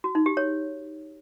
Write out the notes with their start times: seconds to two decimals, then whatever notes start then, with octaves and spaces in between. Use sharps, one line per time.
0.04 F#4
0.15 D#4
0.26 G4
0.37 C#5